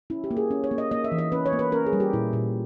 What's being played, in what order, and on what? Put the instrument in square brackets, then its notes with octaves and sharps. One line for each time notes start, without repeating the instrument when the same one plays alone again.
[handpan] C#4 E4
G4
A#3
G#4
C#4
C#5
A#3
D#5
A#3 D#5
E5
E3
D#5
C#4 B4
C#5
A#3
B4
C#4 A#4
G#4
G3
G4
A#2 E4
A#2